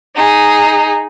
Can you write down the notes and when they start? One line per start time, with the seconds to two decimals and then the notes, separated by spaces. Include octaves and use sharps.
0.14 D#4 G#4